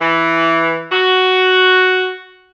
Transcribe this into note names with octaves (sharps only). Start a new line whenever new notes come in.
E3
F#4